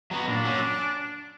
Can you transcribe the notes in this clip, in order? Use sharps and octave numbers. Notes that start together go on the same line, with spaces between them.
F#3 B3 F#4
A#2 D4
F#3 C#4